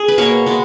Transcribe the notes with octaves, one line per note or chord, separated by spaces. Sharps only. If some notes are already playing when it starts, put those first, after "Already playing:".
Already playing: G#4
B4
B2 A#3 C#5
B2 G#3 B3